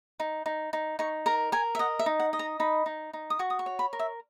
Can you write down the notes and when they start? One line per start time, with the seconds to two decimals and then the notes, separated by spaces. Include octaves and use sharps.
0.20 D#4
0.46 D#4
0.73 D#4
0.99 D#4 C#6
1.26 A#4 A#5
1.52 A#4 G#5
1.75 E5
1.79 D#5 F#5
1.99 E5
2.06 D#4
2.20 F#5
2.33 D#5
2.39 A#5
2.60 D#4 B5
2.86 D#4
3.13 D#4
3.30 D#6
3.39 F#4 C#6
3.50 D#6
3.59 C#6
3.66 C#5
3.79 B5
3.93 A#4
3.99 E5